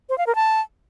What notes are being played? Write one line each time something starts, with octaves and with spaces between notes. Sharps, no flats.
C5
F5
A#4
A5